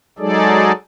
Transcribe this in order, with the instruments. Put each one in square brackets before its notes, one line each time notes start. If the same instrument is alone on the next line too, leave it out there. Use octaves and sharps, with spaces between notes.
[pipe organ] F#3 G#3 D#4 G#4 A4 D5